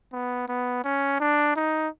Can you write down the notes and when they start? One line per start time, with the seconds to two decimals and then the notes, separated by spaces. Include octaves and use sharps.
0.12 B3
0.48 B3
0.84 C#4
1.20 D4
1.56 D#4